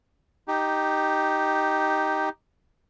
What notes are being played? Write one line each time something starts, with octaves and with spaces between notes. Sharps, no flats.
D#4 G4